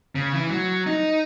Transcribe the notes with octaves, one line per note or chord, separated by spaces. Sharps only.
C#3
E3
F#3
D#4